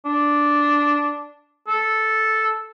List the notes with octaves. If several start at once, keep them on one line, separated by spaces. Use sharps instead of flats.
D4
A4